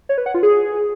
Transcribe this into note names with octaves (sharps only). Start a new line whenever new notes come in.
C#5
B4
F#5
F4
G#4